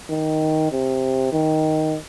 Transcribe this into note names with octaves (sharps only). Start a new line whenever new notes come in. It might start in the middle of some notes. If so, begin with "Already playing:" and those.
D#3
C3
D#3